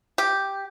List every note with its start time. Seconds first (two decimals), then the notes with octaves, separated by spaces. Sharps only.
0.18 G4